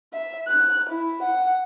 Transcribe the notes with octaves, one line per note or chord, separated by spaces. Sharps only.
E5
F#6
E4
F#5